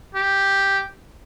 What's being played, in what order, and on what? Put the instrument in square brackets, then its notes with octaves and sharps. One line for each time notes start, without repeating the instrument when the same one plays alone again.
[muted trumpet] G4